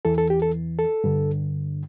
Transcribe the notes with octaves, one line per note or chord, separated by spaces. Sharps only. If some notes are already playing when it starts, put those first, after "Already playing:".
E2 E3 A4
A4
G4
A4
A4
G2 D3